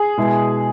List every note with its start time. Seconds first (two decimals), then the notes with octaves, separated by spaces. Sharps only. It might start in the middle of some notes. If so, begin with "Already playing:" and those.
Already playing: G#4
0.18 B2 G#3 E4